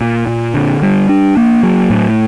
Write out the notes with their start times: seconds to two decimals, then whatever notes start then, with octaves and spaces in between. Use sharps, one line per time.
0.01 A#2
0.27 A#2
0.54 D3
0.82 G3
1.09 D4
1.37 A#3
1.63 F#3
1.90 A2